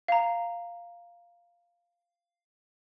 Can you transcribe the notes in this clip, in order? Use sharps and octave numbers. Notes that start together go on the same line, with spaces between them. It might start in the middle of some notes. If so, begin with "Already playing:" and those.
F5 A#5